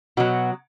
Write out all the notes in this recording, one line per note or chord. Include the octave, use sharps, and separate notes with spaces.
B2 F#3 F#4